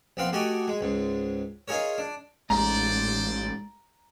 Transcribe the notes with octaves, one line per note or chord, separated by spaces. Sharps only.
A#1 B3 C4 F5 C6
A3 F#4 G4 D#5 G#5
G#3
C#2 G#2
D#4 F4 G#4 A#4 C#5
D4
A1 G#2 C5 D5 A#5